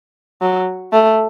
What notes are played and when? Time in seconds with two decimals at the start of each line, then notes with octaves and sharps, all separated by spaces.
0.42 F#3
0.92 A3